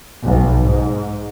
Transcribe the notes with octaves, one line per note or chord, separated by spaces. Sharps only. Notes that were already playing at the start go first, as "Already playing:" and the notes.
B1
G#2